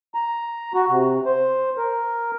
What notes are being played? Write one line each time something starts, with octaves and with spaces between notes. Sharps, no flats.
A#5
F#4
C3
C5
A#4